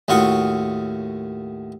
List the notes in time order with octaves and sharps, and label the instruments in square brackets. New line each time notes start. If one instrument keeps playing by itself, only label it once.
[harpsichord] D#2 A2 F4 F#4 C#6 D#6